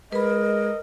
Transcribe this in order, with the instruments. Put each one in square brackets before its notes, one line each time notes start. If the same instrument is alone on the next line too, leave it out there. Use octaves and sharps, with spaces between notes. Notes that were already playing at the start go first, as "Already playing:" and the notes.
[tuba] G#3 [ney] A#4 [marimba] B4 B5 [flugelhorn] D#5